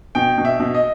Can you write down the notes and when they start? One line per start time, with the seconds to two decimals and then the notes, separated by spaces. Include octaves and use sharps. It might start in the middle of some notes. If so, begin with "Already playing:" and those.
0.15 B2 G5
0.38 B2
0.45 E5
0.60 B2
0.75 D#5